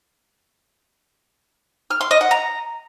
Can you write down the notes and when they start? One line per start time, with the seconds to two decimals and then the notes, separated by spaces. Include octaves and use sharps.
1.91 F6
2.01 C6
2.11 D#5
2.21 F#5
2.31 A#5